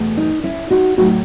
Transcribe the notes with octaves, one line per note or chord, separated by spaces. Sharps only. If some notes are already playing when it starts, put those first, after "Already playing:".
Already playing: E2 B2 A3
D#4
C#4 E4
D#4 F#4
A2 F#3 A3 D#4 F#4